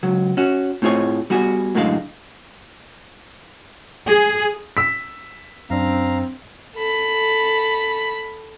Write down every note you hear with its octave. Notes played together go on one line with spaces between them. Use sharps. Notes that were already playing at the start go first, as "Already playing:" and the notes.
C#2 F#3
C#4 F#4
A2 C4 F4 G#4 C#5
G3 B3 F#4 G#4
F#2 A2 D3 G#3 A4 F5
G#4
E6 B6
F#2 C4 D4 F5 A#5
A4 B5